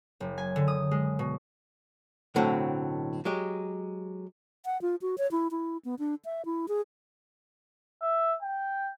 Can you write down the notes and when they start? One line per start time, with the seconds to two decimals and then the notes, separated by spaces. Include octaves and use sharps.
0.20 F#1
0.38 G#5
0.56 D3
0.68 D#6
0.91 G#3
1.19 B2
2.36 B1 A2 D3 F#3 C4
3.25 F#3 G#3 G4
4.65 F#5
4.82 F4
5.02 F#4
5.18 C#5
5.31 E4
5.51 E4
5.85 B3
5.99 D4
6.25 E5
6.45 E4
6.68 G#4
8.02 E5
8.43 G5